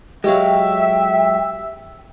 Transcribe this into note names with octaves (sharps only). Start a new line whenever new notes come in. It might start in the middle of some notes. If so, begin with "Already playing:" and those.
F#3 G#3 G4 C#5 E5 F5 G5